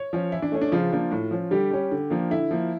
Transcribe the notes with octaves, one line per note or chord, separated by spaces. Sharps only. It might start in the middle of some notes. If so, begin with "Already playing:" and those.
Already playing: C#5
F3 C#4
E3 E4
D4
A3 C#4
D4
C#3 F3 F4
F3 A#3 D4
A2
F3 C#4
D3 G3 G4
G3 C#4
D3
F3 A#3 D4
D3 E4
F3 A#3